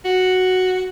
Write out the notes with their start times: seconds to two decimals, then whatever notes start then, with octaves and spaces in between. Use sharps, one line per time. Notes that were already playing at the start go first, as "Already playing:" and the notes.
0.05 F#4